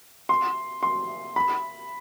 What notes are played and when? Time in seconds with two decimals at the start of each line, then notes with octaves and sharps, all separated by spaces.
0.29 C6
0.83 C6
1.36 B5